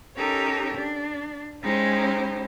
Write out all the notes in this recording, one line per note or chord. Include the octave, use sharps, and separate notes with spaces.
C#4 D#4 G4 A4 A#4 C#5
D4
G#3 C#4 D#4 E4 G4 C5